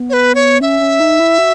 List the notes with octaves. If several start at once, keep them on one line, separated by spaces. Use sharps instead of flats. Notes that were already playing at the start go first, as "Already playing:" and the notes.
Already playing: B3
C#5
B4
C#5
C#4 E5
C#4
D#4
E4
F#4